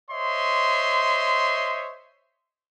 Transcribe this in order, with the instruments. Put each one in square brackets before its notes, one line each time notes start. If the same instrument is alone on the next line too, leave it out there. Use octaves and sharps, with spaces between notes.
[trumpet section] C5 C#5 D#5 E5 C6